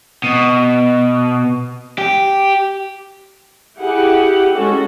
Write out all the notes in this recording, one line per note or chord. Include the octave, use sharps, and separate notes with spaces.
B2
G4
E4 G4 G#4 F#5
G#3 C#4 F#4 A4